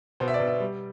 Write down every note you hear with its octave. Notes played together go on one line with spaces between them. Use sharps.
B2 C5
E5
D5
B2
E5
G3